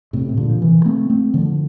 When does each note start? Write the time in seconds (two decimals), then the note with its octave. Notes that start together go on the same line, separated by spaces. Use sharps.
0.13 A2 C3
0.29 C3
0.37 A#2 D3
0.50 F3
0.61 C3 E3
0.85 A3 C4
1.09 A3 C4
1.34 D3 F3